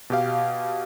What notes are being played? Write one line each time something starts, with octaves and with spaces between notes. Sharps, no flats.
B2 G4 F5